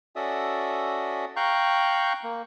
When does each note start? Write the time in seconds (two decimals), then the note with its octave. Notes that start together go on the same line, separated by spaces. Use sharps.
0.16 C#4 F#4 A4 D5 E5 D#6
1.36 F5 G5 A#5 C#6 F#6 G6
2.23 A#3